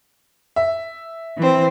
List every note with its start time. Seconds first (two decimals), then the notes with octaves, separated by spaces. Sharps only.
0.56 E5
1.37 E3 C4